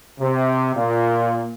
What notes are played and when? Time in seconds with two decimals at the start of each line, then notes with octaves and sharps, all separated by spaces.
0.20 C3
0.75 A#2